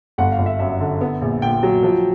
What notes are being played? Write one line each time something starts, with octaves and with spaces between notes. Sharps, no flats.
G1 F#5
F5
G1
E5
F#2 E5
D3
B3
A#1
A#2 G5
F#3
F3